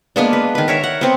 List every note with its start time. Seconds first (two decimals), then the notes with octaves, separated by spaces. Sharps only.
0.16 G#3 A#3 B3 D4
0.33 B4
0.55 D#3 B4
0.68 A#4 C#5 E5
0.84 F#5
1.01 B3 C4